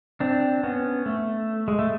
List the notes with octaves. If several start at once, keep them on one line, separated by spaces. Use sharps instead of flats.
C4 D4
B3 C#4
A3
G#3
A3